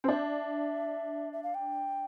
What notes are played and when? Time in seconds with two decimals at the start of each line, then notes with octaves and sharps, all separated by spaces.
0.04 C4
0.08 D4 E5
1.33 E5
1.43 F5
1.54 G5